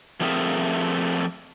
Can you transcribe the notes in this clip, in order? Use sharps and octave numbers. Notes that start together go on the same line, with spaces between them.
F3 A3 C4 G#4 A#4 E5